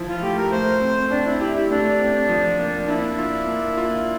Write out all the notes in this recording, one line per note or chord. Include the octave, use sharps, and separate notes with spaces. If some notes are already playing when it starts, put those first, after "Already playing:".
Already playing: F3 E4
F4
A3 G4
A#4
A3 C5
C4
C4 D4
E4
E4 G4
E4
A3 D4
C4
F3
A#3
D4 E4
F4
A#3
F4